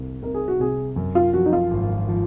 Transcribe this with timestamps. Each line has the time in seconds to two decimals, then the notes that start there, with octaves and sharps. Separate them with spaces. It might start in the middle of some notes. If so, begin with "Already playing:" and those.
Already playing: C2 C3
0.23 C3 A#4
0.34 G#4
0.48 F#4
0.59 C3 G#4
0.96 F#2
1.15 F4
1.33 F3 F#4
1.46 D#4
1.53 F4
1.71 G#1
2.09 F3